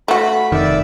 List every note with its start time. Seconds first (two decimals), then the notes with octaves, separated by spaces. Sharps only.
0.08 A3 F#4 B5
0.52 F1 D#3 D5 E5